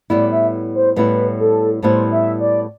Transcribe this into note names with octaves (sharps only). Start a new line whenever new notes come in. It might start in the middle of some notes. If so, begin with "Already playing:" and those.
A2 G3 B3 E4 D5
E5
C5
A2 G3 B3 E4 B4
A4
A2 G3 B3 E4 C5
E5
D5